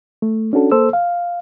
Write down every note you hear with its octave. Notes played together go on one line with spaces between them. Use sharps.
A3
C#4 D4 F#4 A4
A#3 A4 C5 E6
F5